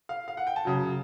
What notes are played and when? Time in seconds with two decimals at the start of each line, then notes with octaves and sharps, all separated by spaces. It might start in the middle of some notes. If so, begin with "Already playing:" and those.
0.09 F5
0.28 F5
0.37 F#5
0.47 G5
0.56 A5
0.65 F#2 C#3 F#3